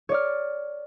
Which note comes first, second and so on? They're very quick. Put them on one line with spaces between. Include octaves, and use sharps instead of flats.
C#5 D5 F6